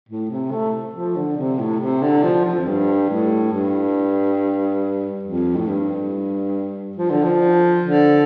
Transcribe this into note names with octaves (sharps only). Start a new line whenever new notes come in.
A2
C3
A3
F3
D3
C3
A2
C3
D3
F3
F3
F2
G2
A2
G2
F2
A2
G2
F3
D3
F3
D3